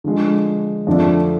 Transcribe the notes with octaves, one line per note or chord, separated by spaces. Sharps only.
D3 F3 G#3
F2 D3 F3 A3 D4